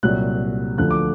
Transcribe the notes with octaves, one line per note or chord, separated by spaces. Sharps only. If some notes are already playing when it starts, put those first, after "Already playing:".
C2 A#2 F#3 F#6
D2 D3 F3 F#6
D6